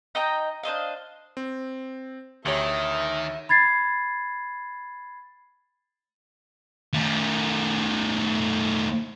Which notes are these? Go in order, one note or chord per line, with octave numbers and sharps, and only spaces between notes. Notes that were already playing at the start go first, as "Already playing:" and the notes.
D#4 D#5 G5 A#5
D4 C5 D#5 F5
C4
D2 D#3 G4 C#5 E5
B5 G#6 A6 C7
D#3 A3